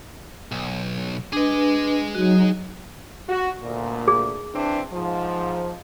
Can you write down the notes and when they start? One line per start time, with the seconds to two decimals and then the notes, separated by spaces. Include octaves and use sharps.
0.52 B1
1.33 D4 G#4 B4 D#5
2.15 F#3 D#4 F#4
3.29 F#4
3.62 D2 A#2
4.08 G#4
4.54 E3 C4 D4
4.93 G#2 F3